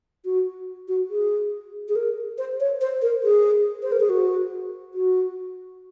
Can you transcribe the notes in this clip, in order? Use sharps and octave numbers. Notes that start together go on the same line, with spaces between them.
F#4
F#4
G#4
G#4
A#4
C5
C#5
C5
A#4
G#4
C5
A#4
G#4
F#4
F#4